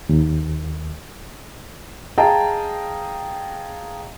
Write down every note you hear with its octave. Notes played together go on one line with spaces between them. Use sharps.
D#2
G#4 D#5 F5 G5 A5 A#5